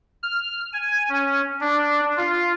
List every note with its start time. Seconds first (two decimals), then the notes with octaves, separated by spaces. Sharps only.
0.23 F6
0.73 G#5
1.09 C#4
1.61 D4
2.17 F4